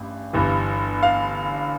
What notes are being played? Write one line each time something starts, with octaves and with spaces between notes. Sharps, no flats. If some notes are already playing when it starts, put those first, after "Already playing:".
Already playing: A1 G2
G1 G2 E3
F5